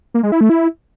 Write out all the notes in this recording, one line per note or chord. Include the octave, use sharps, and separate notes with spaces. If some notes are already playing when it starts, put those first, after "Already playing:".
A#3
G#3
E4
A3
E4